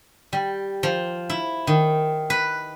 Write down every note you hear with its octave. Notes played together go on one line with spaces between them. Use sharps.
G3
F3
E4
D#3
B4